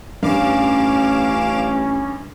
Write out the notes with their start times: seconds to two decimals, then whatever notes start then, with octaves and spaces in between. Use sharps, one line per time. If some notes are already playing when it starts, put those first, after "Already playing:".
0.23 A1 G2 C#4 F5 D6 E7